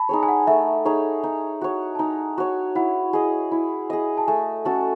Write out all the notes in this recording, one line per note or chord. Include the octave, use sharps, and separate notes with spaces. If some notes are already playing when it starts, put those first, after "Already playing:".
Already playing: A5 B5
D#4 G#4 C#5
G#5
F#5
A3 E5
D#4 G#4 C#5
D#4
F#4 C#5
A5
D#4 G#5
F#4 C#5
E4 F#5
G#4 D#5
E4
G#4 D#5
A5
A3 G#5
C#4 F#4 A4